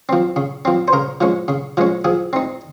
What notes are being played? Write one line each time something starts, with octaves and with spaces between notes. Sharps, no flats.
F3 C4
C#3
F3 C4
C5
C#3 A#4
F3 G#3 C#4
C#3
F3 G#3 C#4
F3 G#4
C4 D#4